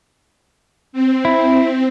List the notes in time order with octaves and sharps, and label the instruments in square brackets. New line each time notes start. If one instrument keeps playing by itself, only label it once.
[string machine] C4
[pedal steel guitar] E4